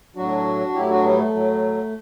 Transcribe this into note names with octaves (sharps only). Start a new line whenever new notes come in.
A2 F#3 D4 F#4
A2 F#3 E4 G4
D4 F#4
G3 B3
A3
A2 F#3